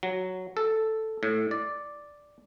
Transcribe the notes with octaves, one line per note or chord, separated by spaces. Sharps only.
F#3
A4
A2
D5